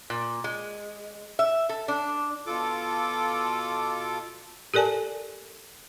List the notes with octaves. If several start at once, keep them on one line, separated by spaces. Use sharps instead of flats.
A#2
G#3
E5
A4
D4
B2 F4 A4 D6
G4 A4 A#4 D5 G#5 A5